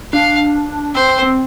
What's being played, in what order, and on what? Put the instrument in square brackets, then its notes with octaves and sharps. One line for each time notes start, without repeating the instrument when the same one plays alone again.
[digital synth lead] D4 [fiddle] F5
[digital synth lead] C4 [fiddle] C5
[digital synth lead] C4
C4